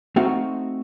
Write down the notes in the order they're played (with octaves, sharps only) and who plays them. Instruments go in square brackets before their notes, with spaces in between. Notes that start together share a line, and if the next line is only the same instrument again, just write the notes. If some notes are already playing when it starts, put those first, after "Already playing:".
[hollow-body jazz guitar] A3 C4 D#4 F#4 F5 F#5